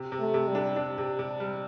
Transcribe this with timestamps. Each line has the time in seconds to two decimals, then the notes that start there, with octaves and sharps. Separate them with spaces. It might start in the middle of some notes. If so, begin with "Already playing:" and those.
Already playing: C3
0.12 C3
0.19 A3
0.34 C3
0.48 G3
0.55 D4
0.76 D4
0.98 C3
1.19 C3
1.40 G3